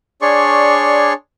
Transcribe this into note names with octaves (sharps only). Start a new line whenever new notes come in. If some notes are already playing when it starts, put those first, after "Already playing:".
D4 G#4 C#5 D5 C6 C#6